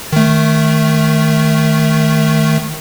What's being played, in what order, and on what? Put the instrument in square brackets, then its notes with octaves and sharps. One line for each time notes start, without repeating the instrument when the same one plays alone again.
[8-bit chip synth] D#3 A3